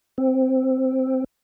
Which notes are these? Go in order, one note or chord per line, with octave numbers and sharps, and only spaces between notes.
C4